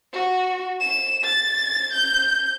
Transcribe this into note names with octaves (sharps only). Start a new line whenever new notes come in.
F#4
E7
A6
G6